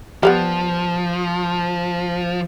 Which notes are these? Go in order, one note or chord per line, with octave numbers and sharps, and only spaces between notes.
F3 G3 A3 B3